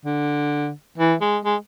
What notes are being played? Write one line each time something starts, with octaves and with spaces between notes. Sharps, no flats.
D3
E3
G#3
G#3